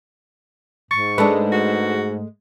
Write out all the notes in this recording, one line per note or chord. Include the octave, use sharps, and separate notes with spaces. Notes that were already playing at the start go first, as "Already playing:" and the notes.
G#2 C#6 A6
G#3 A3 D4 A4 B4
F#4